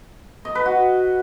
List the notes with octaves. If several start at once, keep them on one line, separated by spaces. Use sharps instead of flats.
D#5
B4
F#4